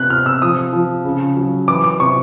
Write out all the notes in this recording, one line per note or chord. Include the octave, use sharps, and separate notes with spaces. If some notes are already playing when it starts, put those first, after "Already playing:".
Already playing: C3 B3 F#6
C3 F6
E6
F3 D#6
F3
C#3
F#3
E3 D6
D6
C3 C#6